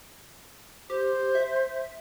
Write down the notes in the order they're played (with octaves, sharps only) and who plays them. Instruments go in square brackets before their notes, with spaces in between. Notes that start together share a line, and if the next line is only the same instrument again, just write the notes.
[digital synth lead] G4 [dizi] C5
[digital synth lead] E5